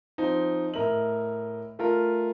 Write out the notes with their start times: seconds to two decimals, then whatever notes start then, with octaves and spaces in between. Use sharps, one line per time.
0.18 F3 C4 D#4
0.74 A2 A#4 D#5 E5 F#7
1.79 A3 F4 A#4